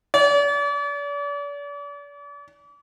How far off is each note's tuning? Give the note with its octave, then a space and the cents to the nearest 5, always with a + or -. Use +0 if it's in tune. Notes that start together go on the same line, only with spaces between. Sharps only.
D5 -40